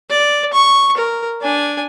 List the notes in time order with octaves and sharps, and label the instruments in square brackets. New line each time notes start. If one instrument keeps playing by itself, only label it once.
[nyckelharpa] D5
C#6
A#4
D4 G#5